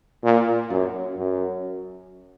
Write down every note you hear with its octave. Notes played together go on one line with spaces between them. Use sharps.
A#2
F#2
F#2